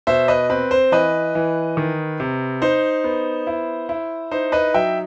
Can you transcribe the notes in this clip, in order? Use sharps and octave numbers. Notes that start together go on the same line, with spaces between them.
B2 C5 E5
B4 D#5
C4 B4
C5
E3 B4 D#5
E3
D#3
C3
D#4 C5
B3
E4
E4
D#4 C5
B4 D#5
F#3 E5 G5